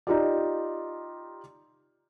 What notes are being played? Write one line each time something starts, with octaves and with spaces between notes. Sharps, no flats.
D#4 F4 G4 D5